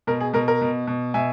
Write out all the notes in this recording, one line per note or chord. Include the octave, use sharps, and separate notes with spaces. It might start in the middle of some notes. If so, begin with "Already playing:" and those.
B2 A#4
G#4
B2 A#4
A#4
B2
B2
B2 E5 G#5